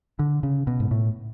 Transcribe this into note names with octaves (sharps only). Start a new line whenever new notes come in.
D3
C#3
B2
G#2
A2